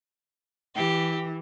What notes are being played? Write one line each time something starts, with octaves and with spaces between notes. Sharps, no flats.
E3 G4